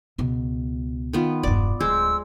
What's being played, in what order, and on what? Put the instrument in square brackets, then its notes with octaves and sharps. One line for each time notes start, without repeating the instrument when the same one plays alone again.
[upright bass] C#2 B2
[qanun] D#3 B3 F4
[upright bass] E1 G2 [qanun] D5
[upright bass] D1 [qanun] G#3 C5 [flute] E6